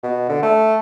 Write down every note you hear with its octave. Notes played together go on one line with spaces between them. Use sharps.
B2
D3
A3